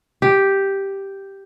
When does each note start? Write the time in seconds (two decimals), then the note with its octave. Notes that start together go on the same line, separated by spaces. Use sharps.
0.22 G4